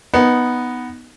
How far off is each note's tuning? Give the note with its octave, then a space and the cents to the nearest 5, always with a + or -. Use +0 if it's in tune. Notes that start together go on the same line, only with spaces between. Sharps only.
B3 +0 D#4 +0